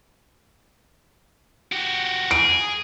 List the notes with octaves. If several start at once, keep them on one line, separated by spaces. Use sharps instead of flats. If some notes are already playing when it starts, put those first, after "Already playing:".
F#4 G4
G#4 D7